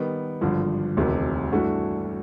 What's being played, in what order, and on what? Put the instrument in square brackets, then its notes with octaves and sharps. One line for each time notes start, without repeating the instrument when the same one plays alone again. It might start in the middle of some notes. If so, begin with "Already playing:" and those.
Already playing: [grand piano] D#3 G3 B3
G#1 G2 D3 F3
E1 D2 C3 D#3
G2 E3 A3 D4 F#4